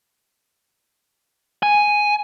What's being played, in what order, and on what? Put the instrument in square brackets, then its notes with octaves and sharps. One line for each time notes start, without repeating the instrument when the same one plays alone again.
[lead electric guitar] G#5